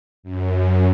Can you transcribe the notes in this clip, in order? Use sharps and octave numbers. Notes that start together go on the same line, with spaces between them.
F#2